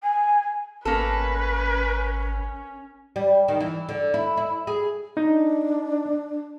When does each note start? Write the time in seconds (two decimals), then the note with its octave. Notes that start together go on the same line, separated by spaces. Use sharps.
0.03 G#5
0.85 G#1 A#3 C#4 A4 B4
3.16 G3
3.48 D#3
3.61 E3
3.89 D3
4.14 E4
4.37 E4
4.67 G#4
5.17 D4 D#4